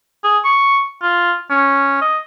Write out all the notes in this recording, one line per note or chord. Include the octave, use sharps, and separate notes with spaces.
G#4
C#6
F4
C#4
D#5